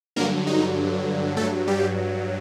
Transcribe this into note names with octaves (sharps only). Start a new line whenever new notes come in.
G2 D3 F#3 A#3 A#4
D#4
G2 F#3 A3 A4
G3 G4